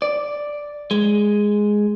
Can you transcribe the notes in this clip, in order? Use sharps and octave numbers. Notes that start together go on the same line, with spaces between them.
D5
G#3